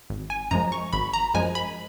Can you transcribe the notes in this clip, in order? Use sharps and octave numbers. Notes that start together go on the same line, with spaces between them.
G#1
G#5
F#2 F3 G#3 A#5
C#6
G#1 B5
A#5
F#2 F3 G#3 G#5
B5